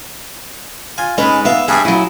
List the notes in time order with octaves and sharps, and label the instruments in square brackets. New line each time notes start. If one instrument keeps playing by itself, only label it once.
[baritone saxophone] F4 [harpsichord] G#5
[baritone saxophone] G#2 [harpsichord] G#3 C#4 [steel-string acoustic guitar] B4
[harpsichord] B3 F5 [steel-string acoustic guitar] E5
[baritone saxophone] G2 [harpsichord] G#4 G#5 [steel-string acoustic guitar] E5
[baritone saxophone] C#3 [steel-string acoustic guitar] F#3 E4